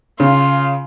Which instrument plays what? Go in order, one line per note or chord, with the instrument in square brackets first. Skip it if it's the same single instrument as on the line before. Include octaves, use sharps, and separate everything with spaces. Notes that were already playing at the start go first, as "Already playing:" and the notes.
[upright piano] C#3 [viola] F4